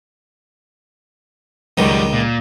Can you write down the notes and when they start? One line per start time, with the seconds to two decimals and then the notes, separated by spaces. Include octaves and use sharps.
1.78 C#2 F#2 D#3 G3
2.13 A#2